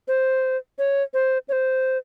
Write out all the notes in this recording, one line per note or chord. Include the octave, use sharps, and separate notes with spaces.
C5
C#5
C5
C#5
C5